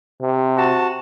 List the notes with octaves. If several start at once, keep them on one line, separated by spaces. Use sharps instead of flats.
C3
F#4 A5